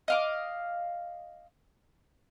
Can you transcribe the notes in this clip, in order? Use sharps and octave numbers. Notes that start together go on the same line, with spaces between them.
D#5 F5 D6